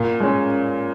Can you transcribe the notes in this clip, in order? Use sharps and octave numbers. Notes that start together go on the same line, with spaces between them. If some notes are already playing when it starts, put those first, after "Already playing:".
Already playing: A#2
G#3 C#4